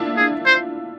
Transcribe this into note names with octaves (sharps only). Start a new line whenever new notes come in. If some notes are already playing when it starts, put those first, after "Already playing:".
Already playing: D4 E4 F4
G#4
C5